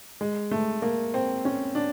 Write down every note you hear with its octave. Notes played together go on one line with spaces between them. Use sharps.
G#3
A3
A#3
C4
C#4
D4